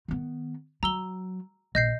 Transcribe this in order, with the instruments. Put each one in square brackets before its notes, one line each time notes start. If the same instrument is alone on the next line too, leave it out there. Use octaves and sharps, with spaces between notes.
[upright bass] D#3 B3
[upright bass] F#3 [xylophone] A#5 E6 G7
[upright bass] A#1 [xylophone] D#5 G6 C7